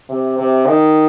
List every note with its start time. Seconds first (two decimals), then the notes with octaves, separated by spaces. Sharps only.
0.09 C3
0.38 C3
0.67 D#3